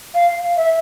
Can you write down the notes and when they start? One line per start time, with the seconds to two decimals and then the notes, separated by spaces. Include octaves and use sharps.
0.15 F5
0.57 E5